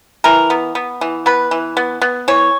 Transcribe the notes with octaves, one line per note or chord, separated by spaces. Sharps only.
E3 A#4
B3
B3
E3
B3 B4
E3
B3
B3
E3 C#5